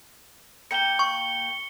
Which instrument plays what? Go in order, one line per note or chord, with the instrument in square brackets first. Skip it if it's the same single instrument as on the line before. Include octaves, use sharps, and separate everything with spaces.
[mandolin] A#3 G5 [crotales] C#7 G7
[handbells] C#6